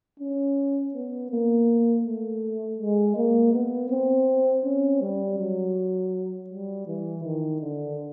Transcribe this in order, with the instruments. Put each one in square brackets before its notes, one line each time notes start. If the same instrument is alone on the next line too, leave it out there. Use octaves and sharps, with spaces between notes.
[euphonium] C#4
B3
A#3
A3
G#3
A#3
B3
C4
C#4
G3
F#3
G3
E3
D#3
D3